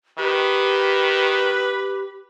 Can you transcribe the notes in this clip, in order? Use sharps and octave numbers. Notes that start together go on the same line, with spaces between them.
D#3 G4 B4